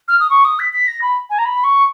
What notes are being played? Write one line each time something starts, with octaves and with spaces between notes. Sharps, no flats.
F6
D#6
C#6
D#6
B6
B6
A#6
B5
G#5
A#5
B5
C#6